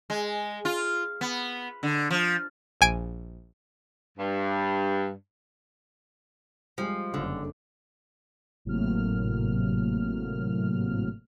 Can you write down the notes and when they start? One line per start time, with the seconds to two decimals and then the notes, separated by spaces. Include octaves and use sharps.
0.10 G#3
0.65 F4
1.21 B3
1.83 D3
2.11 F3
2.81 A#1 G#5 D7
4.18 G2
6.78 F3 G3 G#3
7.14 F#1 F2 D3
8.65 G#1 A2 C3 F#3 A#3 F6